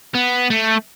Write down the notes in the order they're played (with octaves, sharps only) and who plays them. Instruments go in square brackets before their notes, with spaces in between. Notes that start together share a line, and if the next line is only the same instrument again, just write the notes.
[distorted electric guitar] B3
A3